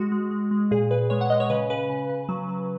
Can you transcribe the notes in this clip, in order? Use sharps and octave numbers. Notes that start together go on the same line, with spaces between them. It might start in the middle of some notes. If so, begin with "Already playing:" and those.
Already playing: G#3 F#4
G#3
G#3
G#3
A#2 G#4
A#2 B4
G#3 C#5
F#5
G#3 D#5
C#5
C#3 B4
C#3 B4
C#3
C#3
F#3
F#3